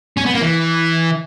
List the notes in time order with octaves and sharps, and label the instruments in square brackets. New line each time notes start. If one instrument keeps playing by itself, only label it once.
[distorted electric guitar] C#4
B3
A#3
E3